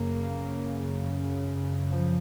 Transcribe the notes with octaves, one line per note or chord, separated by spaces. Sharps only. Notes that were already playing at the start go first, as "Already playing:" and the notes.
Already playing: F#2 C#3 A#3
F3